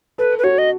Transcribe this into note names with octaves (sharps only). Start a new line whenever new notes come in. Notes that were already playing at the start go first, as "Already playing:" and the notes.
A4 B4
B4
F#4 C#5
D#5